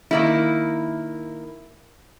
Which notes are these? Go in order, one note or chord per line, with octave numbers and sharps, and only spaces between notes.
D#3 A#3 E4